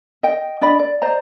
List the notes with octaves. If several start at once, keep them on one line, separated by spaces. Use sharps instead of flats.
D#5 G5
D4 D5 D#5 B5
D5
C5 D5 D#5 A#5